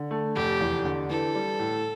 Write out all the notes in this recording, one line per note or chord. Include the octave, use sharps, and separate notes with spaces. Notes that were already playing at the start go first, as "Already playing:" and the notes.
Already playing: D3
A3
F1 G4
E2
D3
E3 A4
G3
A2